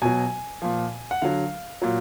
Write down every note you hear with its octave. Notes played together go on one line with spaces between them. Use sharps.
B2 F#3 G#5
A#2 F3
F#5
D3 F#3 F5
A#2 F#3